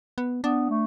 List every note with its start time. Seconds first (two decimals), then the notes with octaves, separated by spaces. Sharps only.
0.18 B3
0.44 B3 D4
0.70 A3